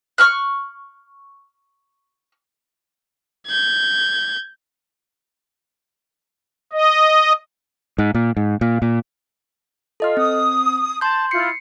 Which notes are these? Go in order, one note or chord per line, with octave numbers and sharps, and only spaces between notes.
C#6 F6 F#6
G6 G#6
D#5
G#2
A#2
G#2
A#2
A#2
F4 A4 D#5 F6
C4 D#6
A5 C6 G6
E4 F4 C7 C#7